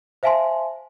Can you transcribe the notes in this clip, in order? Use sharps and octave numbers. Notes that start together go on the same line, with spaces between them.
C5 E5 F5 G#5 A5 C6